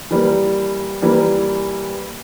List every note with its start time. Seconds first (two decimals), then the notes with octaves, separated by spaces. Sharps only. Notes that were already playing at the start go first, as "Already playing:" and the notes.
0.11 E3 G3 A#3
1.02 E3 G3 A#3